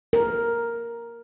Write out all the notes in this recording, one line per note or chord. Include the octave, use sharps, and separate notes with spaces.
A#4